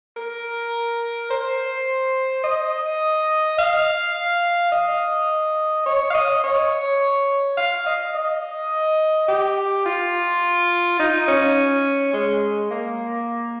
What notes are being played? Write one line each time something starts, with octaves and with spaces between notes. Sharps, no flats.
A#4
C5
D#5
F5
D#5
C#5
F5
D#5
C#5
F5
D#5
D#5
G4
F4
D#4
C#4
G#3
A#3